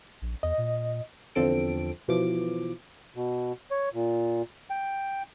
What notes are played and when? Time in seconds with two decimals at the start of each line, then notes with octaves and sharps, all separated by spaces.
0.22 A#1
0.43 E2 D#5
0.58 A#2
1.35 E2 D3 F3 C4 A4 D7
2.08 B2 E3 F3 D6
3.16 B2
3.71 C#5
3.94 A#2
4.70 G5